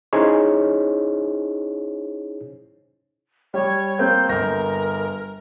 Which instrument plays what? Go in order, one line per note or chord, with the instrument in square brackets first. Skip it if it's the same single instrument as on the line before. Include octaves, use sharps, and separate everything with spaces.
[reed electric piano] C#4 D#4 E4 G#4 C5 C#5
[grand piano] G3 [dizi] C#5
[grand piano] A#3 C4 [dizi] G6
[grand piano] G1 A#6 [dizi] A#4